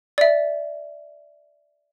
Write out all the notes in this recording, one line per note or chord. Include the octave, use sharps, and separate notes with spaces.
D5 E5